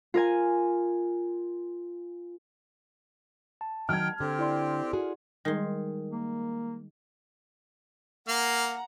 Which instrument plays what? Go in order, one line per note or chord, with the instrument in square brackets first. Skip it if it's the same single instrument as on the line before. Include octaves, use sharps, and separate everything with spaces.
[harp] F4 A#4 G#5
[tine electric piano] A5
[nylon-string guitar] D#3 F#3 [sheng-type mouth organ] G5 [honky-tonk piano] F6 G#6
[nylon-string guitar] D3 [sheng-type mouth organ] C4 G4
[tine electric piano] E4 D5 C6
[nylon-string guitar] F#4 G#4
[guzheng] D#3 C6 [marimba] G3 G#3 G#4
[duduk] A#3
[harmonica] A#3 F5 [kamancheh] F#5 A#5